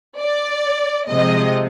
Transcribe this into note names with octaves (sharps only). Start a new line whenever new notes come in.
D5
C3 F3 G#3 C4 D#5